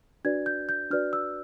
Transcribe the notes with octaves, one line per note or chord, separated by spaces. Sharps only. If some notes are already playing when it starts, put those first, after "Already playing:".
D4 F#4 B4 D5 G#6
G6
G6
D4 F#4 B4 D5 F6
E6